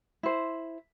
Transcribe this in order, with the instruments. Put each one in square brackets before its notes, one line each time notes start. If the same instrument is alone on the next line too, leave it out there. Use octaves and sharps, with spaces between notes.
[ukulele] E4 C5